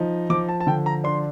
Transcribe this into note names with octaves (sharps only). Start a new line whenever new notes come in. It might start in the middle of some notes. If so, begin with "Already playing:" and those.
Already playing: F3 D#4
F3 D6
A5
A5
D3 G5
A#5
D4 C6